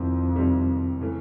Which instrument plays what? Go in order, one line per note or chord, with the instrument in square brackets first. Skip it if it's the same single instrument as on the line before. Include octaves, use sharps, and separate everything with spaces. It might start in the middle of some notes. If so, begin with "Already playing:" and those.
Already playing: [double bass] F2 [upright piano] C3 D#3 G3 C4 E4
[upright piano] C3 D#3 G3 C4 E4
C#3 E3 A3 C#4